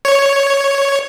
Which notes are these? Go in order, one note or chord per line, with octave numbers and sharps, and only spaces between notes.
C#5